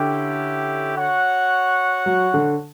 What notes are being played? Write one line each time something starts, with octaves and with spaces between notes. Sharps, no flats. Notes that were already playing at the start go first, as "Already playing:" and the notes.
Already playing: D3 C#4 E4 G4
F#4 C#5 F#5
F#3
D3